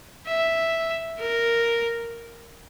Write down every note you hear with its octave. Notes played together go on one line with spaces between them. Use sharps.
E5
A#4